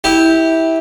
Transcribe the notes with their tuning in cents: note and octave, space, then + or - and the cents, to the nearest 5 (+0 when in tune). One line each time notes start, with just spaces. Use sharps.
E4 -20 G4 +0